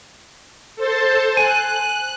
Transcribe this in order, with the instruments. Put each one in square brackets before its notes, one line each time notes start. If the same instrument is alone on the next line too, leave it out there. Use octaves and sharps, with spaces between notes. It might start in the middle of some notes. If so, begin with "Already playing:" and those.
[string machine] A4 C5 A5
[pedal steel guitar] G#5 [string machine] F#6